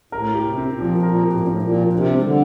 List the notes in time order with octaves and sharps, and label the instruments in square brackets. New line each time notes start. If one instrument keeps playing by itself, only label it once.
[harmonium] A2 [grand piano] A#4
[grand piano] G4
[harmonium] C3
[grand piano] C4
[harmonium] A#2
[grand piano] F3
[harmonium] A2
[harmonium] A#2 [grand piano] A#4
[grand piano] G4
[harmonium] A2
A#2
[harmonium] A2 [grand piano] C4
[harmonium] A#2
[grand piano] F3
[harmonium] C3 [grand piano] D4
[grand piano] G3
[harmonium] D3